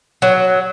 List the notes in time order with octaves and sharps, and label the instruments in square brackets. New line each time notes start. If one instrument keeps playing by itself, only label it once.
[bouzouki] F#3